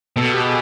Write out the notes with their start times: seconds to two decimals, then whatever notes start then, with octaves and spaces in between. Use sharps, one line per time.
0.16 B2 A4
0.33 G4
0.44 G#4